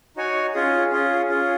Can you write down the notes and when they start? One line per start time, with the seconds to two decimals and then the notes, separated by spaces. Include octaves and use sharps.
0.16 D#4 F#4 C#5 G#5
0.54 C#4 F4 G#4
0.92 C#4 F4 G#4
1.29 C#4 F4 G#4